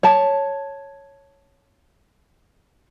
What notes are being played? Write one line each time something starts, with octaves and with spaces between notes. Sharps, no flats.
C#5 A5